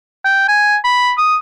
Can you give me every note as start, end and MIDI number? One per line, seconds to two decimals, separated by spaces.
0.25 0.46 79
0.48 0.76 80
0.84 1.12 83
1.18 1.36 87